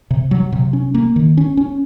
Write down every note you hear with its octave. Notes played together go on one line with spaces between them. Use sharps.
C3
F#3
C3
C#4
A#3
D#3
C#4
C#4